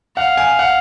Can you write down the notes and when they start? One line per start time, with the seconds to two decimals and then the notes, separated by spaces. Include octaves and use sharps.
0.17 F5 F#5
0.37 G#5
0.59 F#5